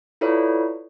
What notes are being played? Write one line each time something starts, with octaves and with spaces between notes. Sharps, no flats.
E4 F4 A4 B4 C#5 D5